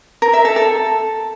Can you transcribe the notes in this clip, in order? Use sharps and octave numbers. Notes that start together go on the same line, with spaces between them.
A#4
E5
A4
A4